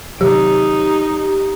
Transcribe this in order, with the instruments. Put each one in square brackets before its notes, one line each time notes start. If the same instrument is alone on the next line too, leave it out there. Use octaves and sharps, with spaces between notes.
[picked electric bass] C3 D#3 F#3 [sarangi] D#4 [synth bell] G4